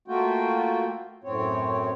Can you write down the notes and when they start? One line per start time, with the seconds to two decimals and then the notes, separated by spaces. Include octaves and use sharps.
0.08 A3 A#3 F4 F#4 G5
1.24 F#2 A2 C4 C#5